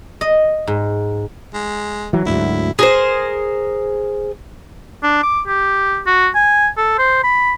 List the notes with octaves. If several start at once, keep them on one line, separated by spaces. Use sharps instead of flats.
D#5
G#2
G#3
E3 F#3
D2 G#2 F#3 E4
G#4 A#4 C5
D4
D6
G4
F#4
G#5
A4
C5
B5